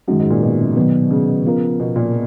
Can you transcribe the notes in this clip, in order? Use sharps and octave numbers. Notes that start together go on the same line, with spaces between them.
F#2 D#3 G#3 D#4 F#4
G#2
A#2
B2
C#3
B2 D#3 F#3 B3
C#3
F3 B3 F4 A#4
B2
A#2